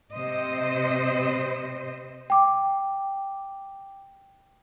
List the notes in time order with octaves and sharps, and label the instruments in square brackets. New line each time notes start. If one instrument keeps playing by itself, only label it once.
[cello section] C3 C5 D#5
[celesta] G5 D6